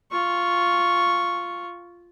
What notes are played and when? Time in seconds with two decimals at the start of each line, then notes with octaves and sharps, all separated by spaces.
0.11 F4 C#6